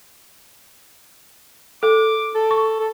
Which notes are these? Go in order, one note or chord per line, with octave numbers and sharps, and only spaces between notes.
A4 D6
A4
C#6
A4